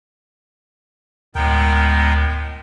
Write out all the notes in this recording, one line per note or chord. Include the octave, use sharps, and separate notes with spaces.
D2 A2 G#3 B3 A#4 G5